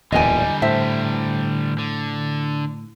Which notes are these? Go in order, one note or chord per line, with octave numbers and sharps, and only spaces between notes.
D1 E2 A#2 D3 G3 D#5 G#5
A2 C5 E5
D3